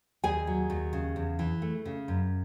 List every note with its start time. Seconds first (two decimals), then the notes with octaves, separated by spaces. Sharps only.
0.23 D#2 G#4 G#5
0.47 F#3
0.70 D#2
0.93 C#3
1.16 E2
1.39 E3
1.62 A3
1.86 C#3
2.08 F#2